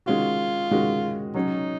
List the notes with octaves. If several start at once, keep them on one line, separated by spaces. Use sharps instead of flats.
D#3 G#3 C#4 F4 F#4
D#3 G#3 C#4 F#4
F#3 C#4 D#4 F#4